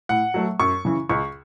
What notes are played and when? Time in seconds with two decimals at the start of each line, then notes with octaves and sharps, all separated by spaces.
0.09 A2 F#5
0.34 F#3 A3
0.59 F#2 C#6
0.85 C#3 E3
1.09 C#2 C#6